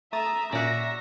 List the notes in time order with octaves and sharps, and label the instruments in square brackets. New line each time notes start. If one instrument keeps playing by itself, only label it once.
[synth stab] A3 D#6 A6 [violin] E5 D#7 [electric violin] A#5
[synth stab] A#2 C#4 B6 [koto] F#4 D5 [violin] E5 A#5 [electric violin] A#6